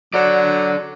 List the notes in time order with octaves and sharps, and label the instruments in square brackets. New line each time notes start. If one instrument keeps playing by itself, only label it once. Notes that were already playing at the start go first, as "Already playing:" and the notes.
[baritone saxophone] F#3 [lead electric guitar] A4 D5